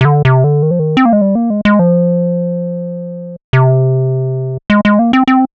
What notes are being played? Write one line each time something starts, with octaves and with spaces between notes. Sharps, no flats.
C3
D3
C3
D3
D#3
F3
D#3
C4
A#3
G#3
G3
A#3
G#3
G#3
F3
C3
G#3
G#3
A#3
C4
C4